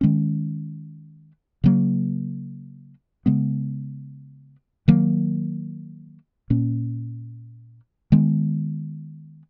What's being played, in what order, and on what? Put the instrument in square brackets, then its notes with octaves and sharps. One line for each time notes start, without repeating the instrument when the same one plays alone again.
[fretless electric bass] D#3 G#3 C#4
C#3 F#3 A#3
C#3 G#3 B3
D#3 F#3 A#3
A#2 A#3 C#4
D#3 G#3 B3